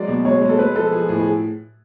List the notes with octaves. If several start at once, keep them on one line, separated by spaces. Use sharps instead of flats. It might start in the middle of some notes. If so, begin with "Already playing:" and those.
Already playing: F#3 G#3 D5
B2
G#3 C#5
G#3
A4
G#3 B4
F3 A4
F3 G#4
A2 G#4
G#4